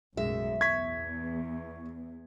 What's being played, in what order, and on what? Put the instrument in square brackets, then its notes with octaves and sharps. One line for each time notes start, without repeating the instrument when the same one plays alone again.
[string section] B1 F#2 A2 [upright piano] G#3 [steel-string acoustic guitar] E5
[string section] E2 [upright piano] C#6 [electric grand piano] G#6 B6